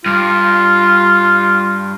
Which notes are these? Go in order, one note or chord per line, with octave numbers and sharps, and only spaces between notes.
G2 F4